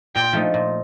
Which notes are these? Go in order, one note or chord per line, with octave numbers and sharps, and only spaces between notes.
A#2 G5
F3 A3 D#4
A#2